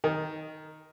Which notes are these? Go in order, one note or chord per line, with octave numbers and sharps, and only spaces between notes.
D#3